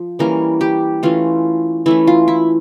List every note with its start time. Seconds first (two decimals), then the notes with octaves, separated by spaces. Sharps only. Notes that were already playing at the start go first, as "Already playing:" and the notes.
Already playing: F3
0.19 E3 G3 A#3 C#4 A#4
0.61 G4
1.03 E3 A3 C#4 F4
1.86 E3 A3 C#4 E4
2.07 F4
2.28 E4